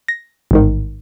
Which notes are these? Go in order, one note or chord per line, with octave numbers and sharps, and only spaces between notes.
A#6
A1 G#2 D#3